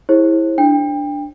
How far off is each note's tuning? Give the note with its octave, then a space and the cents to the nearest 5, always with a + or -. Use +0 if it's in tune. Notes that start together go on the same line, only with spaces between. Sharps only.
E4 -5 G#4 -35 C5 +40
D4 +0 G5 +30